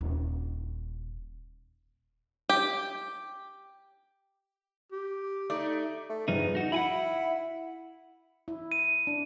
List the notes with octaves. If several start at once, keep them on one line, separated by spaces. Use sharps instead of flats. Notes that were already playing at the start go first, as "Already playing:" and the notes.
D#1
G4
G4
A3 D#4 D5
A3
E2 G2 F3 D#4
D#4 F#4
E4 F#5 G#5 B5
E4
D#7
D4